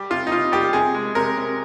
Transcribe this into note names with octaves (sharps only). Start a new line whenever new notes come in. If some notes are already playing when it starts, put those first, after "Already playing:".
Already playing: G3 G4
C3 F4
D#4
C3 F4
G3 G4
C3 G#4
G#3
C3 A#4
C3